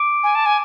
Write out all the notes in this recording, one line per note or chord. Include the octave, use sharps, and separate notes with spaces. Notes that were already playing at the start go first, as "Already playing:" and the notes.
Already playing: D6 D7
G#5
A5
G#5